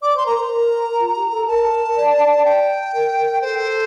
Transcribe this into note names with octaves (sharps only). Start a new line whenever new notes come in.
D5 D6
C5
C6
A#4 A#5
C5
A#4
F4
G4
A4
A#4 A5
D5
G5
A#4
A#4
A4 C5